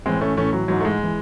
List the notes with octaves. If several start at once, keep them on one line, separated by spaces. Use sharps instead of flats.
A2 E3 G#3 C4
A3 C#4
A2 E3 A3 C#4
F#3
G#2 E3 F#3
A3
G#3
E3